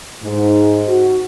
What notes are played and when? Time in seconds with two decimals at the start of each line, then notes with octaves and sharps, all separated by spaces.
0.23 G#2
0.88 F#4